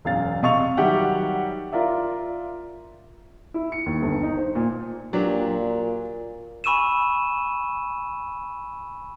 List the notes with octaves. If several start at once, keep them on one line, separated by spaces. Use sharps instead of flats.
E1 F#2 F5 A6
C3 D#5 F5 C#6 A6 F7
D#3 F#3 G3 G4 E5 F#5
F4 A#4 D5 E5
E4
C#7
D#2
G1
D#4
C5
A#2
A#2 F#3 D4 G4
G#5 B5 C#6 E6 D#7 E7